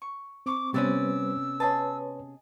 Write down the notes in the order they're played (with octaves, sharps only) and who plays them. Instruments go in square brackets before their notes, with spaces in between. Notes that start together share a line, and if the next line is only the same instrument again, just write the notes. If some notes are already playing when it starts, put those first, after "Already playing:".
[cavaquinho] C#6
[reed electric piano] C4 C#6 [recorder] D6
[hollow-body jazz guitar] C3 B3 C#4 [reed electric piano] G3 B4 C5 [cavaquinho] D5 [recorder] E6
[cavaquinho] G#4 D#5 A5 [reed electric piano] B4 C#5